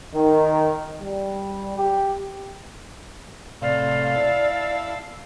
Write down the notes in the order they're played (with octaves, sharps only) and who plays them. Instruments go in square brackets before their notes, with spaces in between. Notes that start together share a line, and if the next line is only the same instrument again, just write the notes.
[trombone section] D#3
G3
G4
[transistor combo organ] A2 C3 [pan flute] D5 [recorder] F5
[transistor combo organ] E4 A5